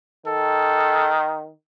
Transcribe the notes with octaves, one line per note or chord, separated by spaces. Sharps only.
D#3 A4